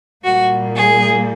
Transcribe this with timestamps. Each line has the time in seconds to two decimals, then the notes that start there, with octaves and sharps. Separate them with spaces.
0.24 A#2 G3 A#3 F#4
0.75 G#4